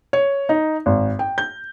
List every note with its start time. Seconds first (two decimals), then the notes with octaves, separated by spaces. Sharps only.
0.13 C#5
0.49 D#4
0.86 G#1
1.19 G5
1.38 G6